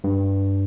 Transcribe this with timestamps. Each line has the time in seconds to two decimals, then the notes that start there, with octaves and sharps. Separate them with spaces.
0.04 G2